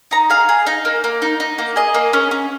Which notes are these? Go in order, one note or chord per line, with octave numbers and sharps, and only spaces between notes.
D#4 A#5
G#4 F5
G#4
D#4
A#3
A#3
D#4
D#4
A#3
G#4 D#5
A#3
C#4
C#4